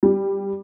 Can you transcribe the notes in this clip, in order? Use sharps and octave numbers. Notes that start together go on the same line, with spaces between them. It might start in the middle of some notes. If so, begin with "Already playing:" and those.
G3